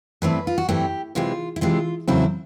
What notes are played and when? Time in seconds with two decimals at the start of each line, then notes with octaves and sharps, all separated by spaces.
0.22 G2 E3 A3 C4 B4
0.47 F4
0.58 F#4
0.69 G2 E3 A3 C4 G4
1.15 C3 E3 G#3 C4 F4
1.56 E4
1.61 C3 E3 G#3 C4 F4
2.08 E2 C#3 F#3 A3 C4 E4